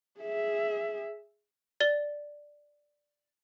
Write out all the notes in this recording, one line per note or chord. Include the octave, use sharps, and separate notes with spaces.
G#4 E5
D5 G7